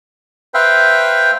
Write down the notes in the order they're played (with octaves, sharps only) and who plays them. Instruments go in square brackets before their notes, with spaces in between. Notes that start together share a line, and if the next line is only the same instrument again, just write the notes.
[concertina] B4 C5 E5 F5 G5